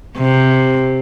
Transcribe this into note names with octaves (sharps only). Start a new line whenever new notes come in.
C3